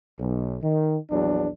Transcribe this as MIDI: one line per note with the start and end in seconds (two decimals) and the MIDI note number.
0.19 0.57 35
0.62 0.98 51
1.11 1.49 34
1.11 1.49 40
1.11 1.49 54
1.11 1.49 62